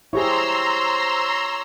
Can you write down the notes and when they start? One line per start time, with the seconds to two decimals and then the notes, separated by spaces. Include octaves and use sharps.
0.13 E4 G4 G#4 C5 C#5 A#5 C6 E6